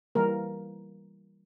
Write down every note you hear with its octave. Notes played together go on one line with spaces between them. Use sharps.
E3 G3 A#3 A#4